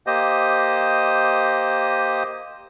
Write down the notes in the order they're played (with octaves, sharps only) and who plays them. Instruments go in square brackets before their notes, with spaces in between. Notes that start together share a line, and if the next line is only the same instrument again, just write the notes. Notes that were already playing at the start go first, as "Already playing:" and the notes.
[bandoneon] A#3 G4 C5 D#5